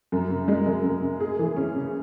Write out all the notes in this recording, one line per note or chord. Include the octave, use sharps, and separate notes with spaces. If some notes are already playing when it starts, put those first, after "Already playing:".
F#2
C#3
G#3
F#2
F#2
C#3
G#4
E3
C#4
C#3